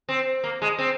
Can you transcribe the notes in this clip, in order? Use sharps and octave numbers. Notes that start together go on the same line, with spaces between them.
C4
A#3
G#3
C4